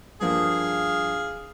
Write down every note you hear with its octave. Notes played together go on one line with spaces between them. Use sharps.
G2 F3 A#3 G#4 F5